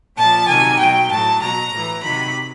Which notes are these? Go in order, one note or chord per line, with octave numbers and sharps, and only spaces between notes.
A#2 F3 A5
C3 D#3 F#3 G#5
B2 F#3 G5
A2 F#3 A5
B2 F#3 A#5
A2 E3
C3 D#3 F#3 B5